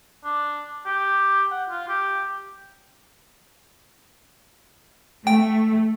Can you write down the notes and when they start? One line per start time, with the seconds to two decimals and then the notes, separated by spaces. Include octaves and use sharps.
0.24 D4
0.86 G4
1.51 F#5
1.69 F4
1.89 G4
5.27 A3 G5